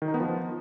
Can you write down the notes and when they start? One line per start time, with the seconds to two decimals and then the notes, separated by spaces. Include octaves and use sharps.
0.02 D#3
0.08 D#4
0.14 B3
0.20 F3